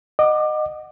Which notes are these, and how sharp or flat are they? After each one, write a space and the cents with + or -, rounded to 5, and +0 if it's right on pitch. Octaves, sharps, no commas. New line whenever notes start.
D#5 -20 F#5 +0 D6 +20